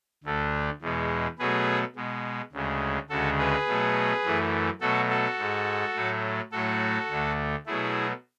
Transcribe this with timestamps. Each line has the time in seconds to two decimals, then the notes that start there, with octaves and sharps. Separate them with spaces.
0.24 D2 D3 A3
0.81 E2 B2 G#3
1.39 B2 F#3 A3 G#4 B4
1.96 B2 G#3
2.52 D2 C#3 G#3
3.10 D2 C#3 G#3 F#4 A4
3.38 G#4 B4
3.67 B2 F#3 A3
4.24 F#2 E3 A3
4.81 B2 F#3 A3 F#4 A4
5.10 F#4 A4
5.38 G#2 G#3
5.95 A2 F#3 A3
6.52 A2 F#3 A3 F#4 A4
7.09 D2 D3 A3
7.66 B2 F#3 A3 E4 G#4